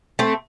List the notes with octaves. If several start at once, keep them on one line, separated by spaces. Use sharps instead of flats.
A3 C4